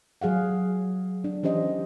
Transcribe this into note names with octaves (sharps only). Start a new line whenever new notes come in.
F#3 G#4 F5 F#5
D4
E3 C#4 G4 C5 D#5